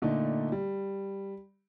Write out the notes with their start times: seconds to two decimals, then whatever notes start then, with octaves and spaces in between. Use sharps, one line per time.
0.02 A#2 D3 A3 D#4
0.52 G3